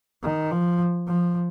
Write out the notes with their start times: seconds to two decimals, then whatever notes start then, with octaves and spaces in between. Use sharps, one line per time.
0.23 D#3
0.51 F3
1.07 F3